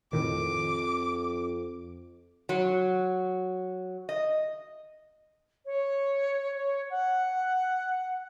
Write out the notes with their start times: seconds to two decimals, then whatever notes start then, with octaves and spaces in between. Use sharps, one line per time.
0.13 F2 A2 D#3 D6
2.49 F#3
4.09 D#5
5.65 C#5
6.56 C#5
6.90 F#5